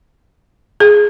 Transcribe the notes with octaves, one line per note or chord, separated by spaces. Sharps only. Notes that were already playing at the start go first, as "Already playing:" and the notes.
G#4